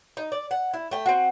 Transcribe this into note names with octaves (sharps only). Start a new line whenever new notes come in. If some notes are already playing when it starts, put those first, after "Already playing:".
D#4
D5
F#5
E4
A3 G5
C4 F#4